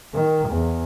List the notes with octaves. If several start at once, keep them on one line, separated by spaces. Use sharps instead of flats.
D#3
E2